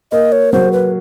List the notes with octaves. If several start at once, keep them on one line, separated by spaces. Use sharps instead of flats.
A#3 D#5
C#5
F#3 C5
B4